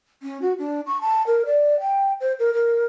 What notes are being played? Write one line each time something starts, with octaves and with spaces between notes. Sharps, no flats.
C#4
F#4
D4
C#6
A5
A#4
D5
G5
C5
A#4
A#4